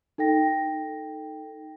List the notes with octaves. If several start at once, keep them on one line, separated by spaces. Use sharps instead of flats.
D#4 A4 G5 A#6